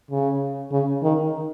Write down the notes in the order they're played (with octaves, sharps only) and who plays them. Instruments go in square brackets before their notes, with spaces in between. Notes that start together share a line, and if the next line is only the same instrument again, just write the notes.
[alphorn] C#3
C#3
D#3